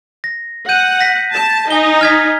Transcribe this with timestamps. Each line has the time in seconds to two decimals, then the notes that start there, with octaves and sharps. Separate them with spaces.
0.24 A#6
0.69 F#5 G6 D#7
1.01 A#6 B6
1.34 A5
1.70 D#4 G#5 G7
2.01 F6 G#6 B6